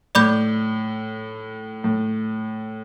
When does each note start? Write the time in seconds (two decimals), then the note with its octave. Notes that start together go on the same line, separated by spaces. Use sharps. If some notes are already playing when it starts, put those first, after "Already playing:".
0.15 A2 D5 B5 D6 G6
1.84 A2